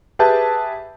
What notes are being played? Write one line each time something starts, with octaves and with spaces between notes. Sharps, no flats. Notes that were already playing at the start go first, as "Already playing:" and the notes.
G4 G#4 B4 E5 A5 G6